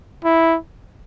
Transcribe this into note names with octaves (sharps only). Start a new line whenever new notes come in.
E4